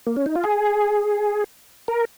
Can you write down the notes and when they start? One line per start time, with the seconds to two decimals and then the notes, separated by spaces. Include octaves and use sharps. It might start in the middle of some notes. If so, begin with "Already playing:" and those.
0.07 A#3
0.16 C#4
0.26 D#4
0.35 F4
0.44 G#4
1.88 A#4